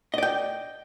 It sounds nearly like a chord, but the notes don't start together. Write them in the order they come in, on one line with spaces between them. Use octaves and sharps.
D#5 D5 G5